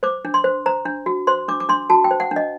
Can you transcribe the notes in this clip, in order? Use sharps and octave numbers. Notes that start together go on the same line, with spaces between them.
C5 D6
D4
C6
C5
C5 A#5
D4
F#4
C5 C6
D4 D6
D6
D4 C6
F#4 A5
G5
C5
F#5
D4
D#5